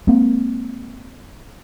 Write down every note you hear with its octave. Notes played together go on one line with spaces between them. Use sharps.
G#3 A#3 C4